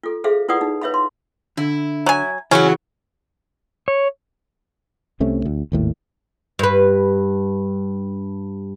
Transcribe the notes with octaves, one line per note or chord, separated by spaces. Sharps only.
F4 A4
G#4 A4 C5 E5 F5
E4 F4 B4 D5 F#5 D#6
D#4
B4 C#5 E5 F5 B5
C6
D3 E4
F#3 G#5
C#3 E3 F#3 C#4 F#4
C#5
C2 C3 A3 C#4
D2
G#1 D#2 A2
G2 B4